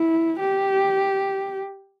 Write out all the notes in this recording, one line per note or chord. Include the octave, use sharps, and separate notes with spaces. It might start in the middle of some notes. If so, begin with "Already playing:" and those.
Already playing: E4
G4